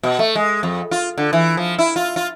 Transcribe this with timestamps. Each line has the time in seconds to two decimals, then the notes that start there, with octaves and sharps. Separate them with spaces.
0.03 B2
0.19 A3
0.35 G#3
0.63 F2
0.91 F4
1.18 D3
1.33 E3
1.57 F3
1.79 E4
1.96 F4
2.16 F4